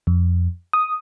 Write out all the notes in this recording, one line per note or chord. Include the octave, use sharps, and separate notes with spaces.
F2
D#6